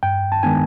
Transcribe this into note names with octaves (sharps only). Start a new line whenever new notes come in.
G2 G5
A5
D#3 G#3 B3 D4 G#5